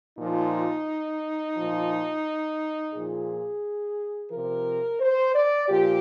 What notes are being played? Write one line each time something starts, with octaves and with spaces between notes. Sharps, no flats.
A#2 F3 D#4
A#2 F3
A#2 F3 G#4
C3 F3 A#4
C5
D5
A#2 F3 G4